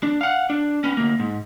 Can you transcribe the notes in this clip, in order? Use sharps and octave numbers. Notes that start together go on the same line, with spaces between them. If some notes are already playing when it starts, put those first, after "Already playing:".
D4
F5 F#5
D4
B3 C#4
D2 A#3
G#2